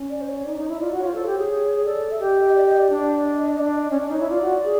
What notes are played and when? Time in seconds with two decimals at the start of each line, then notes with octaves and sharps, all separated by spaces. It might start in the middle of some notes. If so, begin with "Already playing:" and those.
Already playing: C#4
0.10 D5
0.21 C5
0.28 C#5
0.45 D#4 D5
0.57 D#4 C#5
0.68 E4
0.74 D#5
0.81 F4 D5
0.91 F#4
0.98 C#5
1.04 F4
1.09 C5
1.14 A4
1.20 C#5
1.26 G4
1.38 G#4
1.84 A4 D5
2.11 E5
2.20 G4 D#5
2.32 D#5
2.43 D#5
2.55 D5
2.66 D#5
2.77 D5
2.90 D4
3.16 D5
3.25 D#5
3.43 D#5
3.55 D#5
3.59 D4 D5
3.77 D#5
3.90 C#4 D5 D#5
4.00 D4
4.09 D#4 C#5
4.20 E4
4.29 F4 D5
4.42 F#4
4.64 G#4